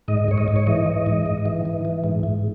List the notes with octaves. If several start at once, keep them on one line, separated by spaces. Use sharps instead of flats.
G#2 D#5
G#2 C#5
D#5
G#2
C#5
E3 D#5
E3
G#2
G#2
E3
E3
E3
G#2
G#2